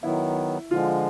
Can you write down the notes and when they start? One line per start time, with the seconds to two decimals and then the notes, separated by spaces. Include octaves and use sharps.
0.03 D#3 F#3 B3 E4
0.71 D3 F3 G#3 F4